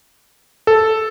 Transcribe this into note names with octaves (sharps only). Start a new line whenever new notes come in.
A4